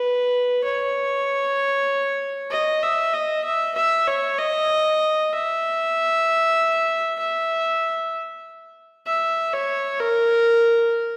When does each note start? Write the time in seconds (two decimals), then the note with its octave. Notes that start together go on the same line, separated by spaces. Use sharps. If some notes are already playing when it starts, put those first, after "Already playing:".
Already playing: B4
0.64 C#5
2.51 D#5
2.82 E5
3.14 D#5
3.45 E5
3.76 E5
4.07 C#5
4.38 D#5
5.32 E5
7.19 E5
9.06 E5
9.53 C#5
10.00 A#4